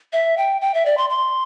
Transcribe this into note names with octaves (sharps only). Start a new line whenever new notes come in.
E5
G5
G5
E5
D5
C6
C6